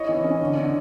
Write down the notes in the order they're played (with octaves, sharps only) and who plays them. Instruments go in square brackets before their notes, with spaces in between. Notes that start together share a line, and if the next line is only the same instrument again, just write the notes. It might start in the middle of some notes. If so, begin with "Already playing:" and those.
Already playing: [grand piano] E4 C#5 D#5
E3
C#4
D3
D3